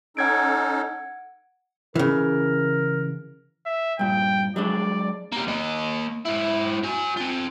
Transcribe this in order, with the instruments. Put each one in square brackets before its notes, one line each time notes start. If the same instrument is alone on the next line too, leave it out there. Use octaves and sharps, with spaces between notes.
[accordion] C#4 D#4 A4 [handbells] F#5 G#6 D7
[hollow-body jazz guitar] C#3 E3 [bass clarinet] A#4
[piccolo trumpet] E5
[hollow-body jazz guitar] G2 A#2 [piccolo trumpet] G5
[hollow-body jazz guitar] F#3 G#3 D4 [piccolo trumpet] D5
[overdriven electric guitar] G3 A#3
A#3 D#5
G#2 E4
F#4 G#5
C4 F4